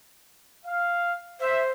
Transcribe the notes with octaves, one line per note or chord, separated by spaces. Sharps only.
F5
C5 E5